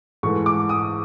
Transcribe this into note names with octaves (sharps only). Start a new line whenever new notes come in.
G#2 E3 A3 C#6
D6
D#6